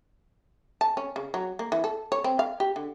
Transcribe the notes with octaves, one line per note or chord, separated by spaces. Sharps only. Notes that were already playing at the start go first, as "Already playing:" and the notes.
A5
C#4
C#3
F#3
A#3
E3
A4
C#5
C4
F5
G4
D3